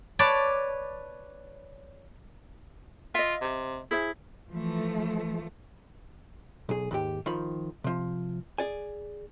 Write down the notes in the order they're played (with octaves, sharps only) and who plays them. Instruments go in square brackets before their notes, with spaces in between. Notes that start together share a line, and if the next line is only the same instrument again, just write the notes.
[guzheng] B4 C#5 D5 A5
[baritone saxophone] F4 [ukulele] D#5 E5
[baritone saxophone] C3
[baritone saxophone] E4 [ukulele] G#4 C5 E5
[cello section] E3 F3 A3
[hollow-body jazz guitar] B1 G#4
D#2 G#2 G4
D#3 F3 B5
C3 F3
G#4 D5 G#5